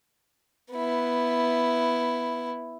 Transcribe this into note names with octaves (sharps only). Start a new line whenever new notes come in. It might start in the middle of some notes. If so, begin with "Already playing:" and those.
B3 E4